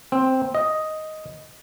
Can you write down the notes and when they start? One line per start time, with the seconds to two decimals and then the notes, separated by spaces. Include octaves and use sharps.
0.12 C4
0.54 D#5